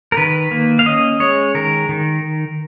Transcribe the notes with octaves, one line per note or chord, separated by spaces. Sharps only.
A#4
D#3 B4
A#3
F5
C#4 D#5
G#3 C#5
D#3 A#4
D#3